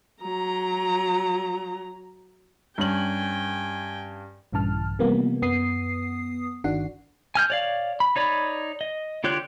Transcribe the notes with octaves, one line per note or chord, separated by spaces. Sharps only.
F#3 A#5
G2 C#4 G5 G#5 F#7
A#1 G2 C#3 E3 A5 F6
C3 E3 F3 G3 A#3 B3
F#2 B3 D#6 C7
G1 D#3 D4 F#4 F#5 C7
G#5 F6 G6
C#5 D5 F5
B5
D#4 C#5 D5 B5
D#5
D3 F4 G4 C#5 F#6